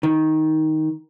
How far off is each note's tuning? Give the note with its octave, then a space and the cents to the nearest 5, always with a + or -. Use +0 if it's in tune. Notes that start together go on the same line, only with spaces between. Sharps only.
D#3 +10